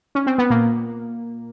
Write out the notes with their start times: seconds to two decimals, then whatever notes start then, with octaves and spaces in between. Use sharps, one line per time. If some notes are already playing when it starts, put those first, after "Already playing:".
0.15 C#4
0.27 C4
0.38 B3
0.50 A#2 A#3